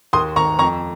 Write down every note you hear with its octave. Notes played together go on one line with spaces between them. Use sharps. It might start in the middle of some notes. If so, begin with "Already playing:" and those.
D#2 C6 D#6
D#3 A#5 C#6
F2 A#5 C#6